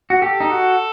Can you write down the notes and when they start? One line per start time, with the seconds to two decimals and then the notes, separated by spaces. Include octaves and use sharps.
0.10 F#4
0.22 G4 A4
0.40 D#4
0.50 F#4